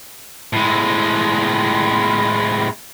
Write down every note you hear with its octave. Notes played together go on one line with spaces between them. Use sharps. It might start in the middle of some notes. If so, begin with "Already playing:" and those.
A2 G#3